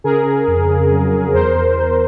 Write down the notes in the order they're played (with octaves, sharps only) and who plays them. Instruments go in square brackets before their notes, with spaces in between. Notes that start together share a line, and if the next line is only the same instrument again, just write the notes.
[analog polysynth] C#3 G#4 A#4
C#3
F2
C#3
F#3
F#3
E2 A#4 C5
E2
E2